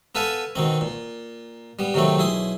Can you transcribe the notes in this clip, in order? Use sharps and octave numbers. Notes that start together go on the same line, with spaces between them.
B3 A4 B4 F5 G#5 A5
B2 D#3 C4
A#2
G3 B3
C3 D#3 F#3 A3 C4
B1 E4 G#4 C6